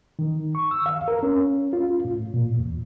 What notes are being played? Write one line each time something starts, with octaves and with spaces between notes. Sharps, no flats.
D#3
C#6
E6
F5
A#4
C#4
F4
A2
A#2
E2